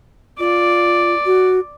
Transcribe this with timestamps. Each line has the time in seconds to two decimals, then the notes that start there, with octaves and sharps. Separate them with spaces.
0.39 F4 D5
1.25 F#4